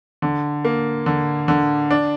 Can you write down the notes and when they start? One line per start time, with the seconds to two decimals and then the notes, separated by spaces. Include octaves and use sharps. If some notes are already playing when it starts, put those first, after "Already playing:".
0.22 D3
0.65 A#3
1.06 D3
1.48 D3
1.91 D4